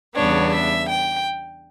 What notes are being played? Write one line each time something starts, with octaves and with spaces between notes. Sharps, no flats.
E2 C#3 G3 B3 D4 C#5
E5
G5